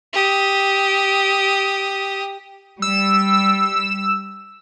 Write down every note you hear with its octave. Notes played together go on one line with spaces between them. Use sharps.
G4 D#6
G3 E6